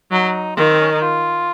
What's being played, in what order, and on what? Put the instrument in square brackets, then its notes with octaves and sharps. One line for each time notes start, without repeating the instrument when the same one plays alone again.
[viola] F#3 [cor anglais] D#4
[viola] D#3 [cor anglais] F4
[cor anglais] C4
C#4
D#4
F4